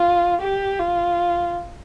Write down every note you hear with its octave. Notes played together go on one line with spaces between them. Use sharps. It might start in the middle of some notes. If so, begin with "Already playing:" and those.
Already playing: F4
G4
F4